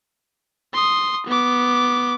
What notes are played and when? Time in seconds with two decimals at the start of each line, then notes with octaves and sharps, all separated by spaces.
0.74 C6 D#6
1.26 B3 D6